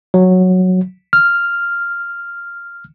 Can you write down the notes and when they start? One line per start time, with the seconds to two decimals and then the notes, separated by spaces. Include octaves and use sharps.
0.14 F#3
1.13 F6